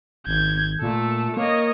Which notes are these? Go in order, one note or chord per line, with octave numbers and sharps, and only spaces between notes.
G#1 G6 G#6
A#2 A3 A4
A#3 C#5 D#5